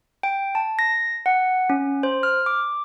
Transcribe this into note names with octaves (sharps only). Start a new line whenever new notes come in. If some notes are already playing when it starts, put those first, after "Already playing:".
G5
A5
A#6
F#5
C#4
C5
F6
D6